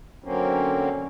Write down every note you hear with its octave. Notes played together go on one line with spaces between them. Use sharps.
D3 F#3 A#3 C4 C#4